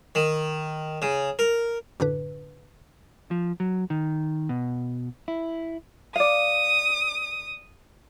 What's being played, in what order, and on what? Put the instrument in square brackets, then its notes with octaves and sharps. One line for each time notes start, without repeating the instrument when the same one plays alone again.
[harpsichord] D#3
C#3
A#4
[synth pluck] F#2 A2 D3 D4 B4
[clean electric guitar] F3
F#3
D#3
B2
E4
[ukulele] D5 F5 [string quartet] D#6